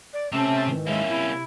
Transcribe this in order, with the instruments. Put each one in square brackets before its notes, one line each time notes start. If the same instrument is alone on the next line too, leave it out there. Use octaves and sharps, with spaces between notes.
[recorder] D5
[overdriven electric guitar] C3 C4 [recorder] A3 [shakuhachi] C#4 [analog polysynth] E5 A5
[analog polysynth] G#2 D#3 E3
[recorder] G#3 [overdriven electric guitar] A#3 C#4 [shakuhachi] E5
[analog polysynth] C3 [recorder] E4